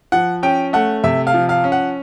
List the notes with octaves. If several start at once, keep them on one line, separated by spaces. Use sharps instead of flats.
F3 F#5
C#4 G5
A3 F#5
C3 E5
F5
F3
F5
C#4
F#5